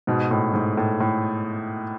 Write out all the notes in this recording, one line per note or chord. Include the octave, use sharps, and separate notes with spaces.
G#2 B2
A2
G#2
A2
A2